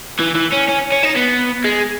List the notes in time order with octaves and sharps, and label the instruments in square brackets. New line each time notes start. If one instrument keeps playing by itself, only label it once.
[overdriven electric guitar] E3
E3
C#4
C#4
C#4
D#4
B3
G#3